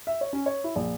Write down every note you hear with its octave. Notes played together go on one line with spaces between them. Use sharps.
E5
C#5
C#4
C#5
E4
A#1